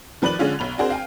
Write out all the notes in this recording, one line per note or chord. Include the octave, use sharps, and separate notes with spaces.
D#3 F3 B4 D5 F#6 F#7
D3 G#3 C#4 F4
B1 B5 F7
C4 D4 F#4 G#4 A#4 C5
F5 G5 G#5